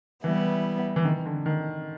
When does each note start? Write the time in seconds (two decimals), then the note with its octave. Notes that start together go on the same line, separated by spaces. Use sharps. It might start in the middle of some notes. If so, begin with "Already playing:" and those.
0.24 E3 G3 B3 E4
0.96 E3
1.05 D#3
1.26 D3
1.46 D#3